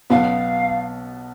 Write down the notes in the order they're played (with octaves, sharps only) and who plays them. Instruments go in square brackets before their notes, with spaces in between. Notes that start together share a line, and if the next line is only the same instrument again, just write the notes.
[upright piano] B1 B2 F#3 B3 [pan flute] F5